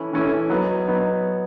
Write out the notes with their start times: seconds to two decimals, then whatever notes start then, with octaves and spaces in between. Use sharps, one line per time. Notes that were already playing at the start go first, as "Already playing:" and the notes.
Already playing: E3 A3 C#4 E4
0.13 E3 A3 C#4 E4
0.50 F#3 B3 D#4
0.87 F#3 B3 D#4